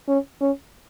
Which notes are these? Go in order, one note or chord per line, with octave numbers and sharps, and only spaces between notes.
C#4
C#4